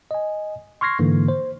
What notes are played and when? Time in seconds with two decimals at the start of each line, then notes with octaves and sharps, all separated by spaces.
0.11 D#5 G#5
0.81 C6 C#6 F6 G#6 A#6 C7
0.99 G#2 D3 E3 A#3
1.28 C5